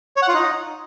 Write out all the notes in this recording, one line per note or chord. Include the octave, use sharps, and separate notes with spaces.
C#5
F#5
F4
D#4